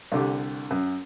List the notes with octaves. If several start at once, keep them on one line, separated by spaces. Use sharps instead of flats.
C2 D3 G4
F#2